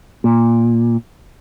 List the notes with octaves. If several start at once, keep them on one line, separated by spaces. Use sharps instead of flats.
A#2